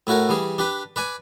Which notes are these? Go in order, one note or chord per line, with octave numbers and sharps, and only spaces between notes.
A2 E4 F#4 A4 A#4
E3 G3 G#4
D4 G4 B4
B4 D5 G#5